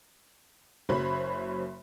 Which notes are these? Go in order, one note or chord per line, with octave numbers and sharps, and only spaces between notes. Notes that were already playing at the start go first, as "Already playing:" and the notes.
F#1 F#2 C5 C#5 B5